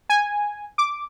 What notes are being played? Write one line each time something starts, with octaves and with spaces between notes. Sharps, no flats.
G#5
D6